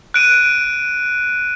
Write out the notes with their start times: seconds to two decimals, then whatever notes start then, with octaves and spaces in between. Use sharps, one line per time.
0.14 F#6 D7 D#7